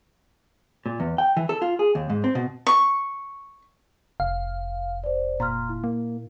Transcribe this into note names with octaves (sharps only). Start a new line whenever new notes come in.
A#2
E2
G5
E3
A4
F4
G#4
D#2
G#2
C4
B2
C#6
F1 F5
C5 D5
A#2 A#5 C6 F6
E4
A#3